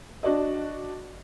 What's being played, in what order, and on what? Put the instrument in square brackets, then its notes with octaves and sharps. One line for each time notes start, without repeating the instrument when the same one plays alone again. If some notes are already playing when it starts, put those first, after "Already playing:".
[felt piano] D4 F#4 D5 D#5